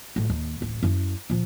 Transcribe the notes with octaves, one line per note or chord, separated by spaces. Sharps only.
A#1 A2
D#2
D1 A1
F#2 E4
A#2 F3